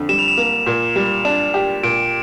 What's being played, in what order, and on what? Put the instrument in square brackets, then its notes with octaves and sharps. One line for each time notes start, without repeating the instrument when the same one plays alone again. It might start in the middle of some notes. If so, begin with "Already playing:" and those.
Already playing: [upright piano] F2 D3
[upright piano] G3 [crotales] E7
[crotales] F7
E7
[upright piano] A#3
A#2
G3
[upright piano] D4 [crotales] E7
[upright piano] G4
[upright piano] A#2 [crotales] D7